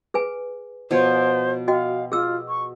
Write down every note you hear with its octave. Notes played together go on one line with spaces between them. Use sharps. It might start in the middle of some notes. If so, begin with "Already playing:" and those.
G#4 B4 G#5
B2 F3 C5 C#5
F#4 D#5 F5 G5
F4 G#4 E6
C#6